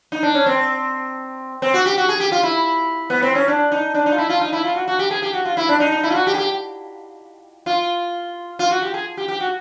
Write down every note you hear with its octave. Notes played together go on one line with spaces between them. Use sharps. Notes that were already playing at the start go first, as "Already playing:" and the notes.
D#4
D4
C#4
C4
C4
F#4
G4
F#4
G#4
G4
F4
E4
B3
C4
C#4
D4
D#4
D4
D#4
F4
E4
F4
D#4
E4
F4
F#4
F#4
G4
G#4
G4
F#4
F4
E4
D4
D#4
D#4
E4
F4
F#4
G4
G#4
G4
F4
F4
F#4
G4
G#4
G4
G4
F#4